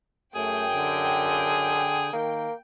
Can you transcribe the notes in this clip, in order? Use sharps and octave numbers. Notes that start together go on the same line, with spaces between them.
F#2 A3 G#4 G5
D3
D#3 A#3